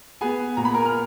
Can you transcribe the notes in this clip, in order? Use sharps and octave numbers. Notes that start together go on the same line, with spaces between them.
B3 G#4 G#5
A#2 A#5
B5
A#4 A#5
F6